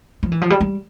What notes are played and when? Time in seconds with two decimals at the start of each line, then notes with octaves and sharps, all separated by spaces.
0.23 F3
0.32 E3
0.41 F3
0.50 G3
0.61 G3